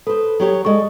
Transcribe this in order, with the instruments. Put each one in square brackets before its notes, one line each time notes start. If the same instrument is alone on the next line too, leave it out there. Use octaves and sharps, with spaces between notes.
[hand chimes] A4 [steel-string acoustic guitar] B4 C5
[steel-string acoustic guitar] F#3 G4 C#5
[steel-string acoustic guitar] G#3 A4 D5 [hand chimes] D#5 C#6